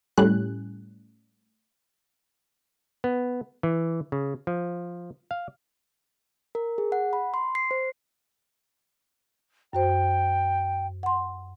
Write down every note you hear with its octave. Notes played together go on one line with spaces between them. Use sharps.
A2 G3 C#4 F#6
B3
E3
C#3
F3
F5
A#4
G#4
F#5
B5
C6
C7
C5
F#2 F#4 C5 G5
F#5 C6